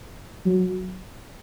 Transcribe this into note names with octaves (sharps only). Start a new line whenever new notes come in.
F#3